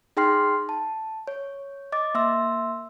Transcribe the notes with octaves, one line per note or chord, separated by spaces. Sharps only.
D#4 G#4 G5 C6 F6 C7
A5
C#5
D#5 D6 A6
A#3 E5 C6 E6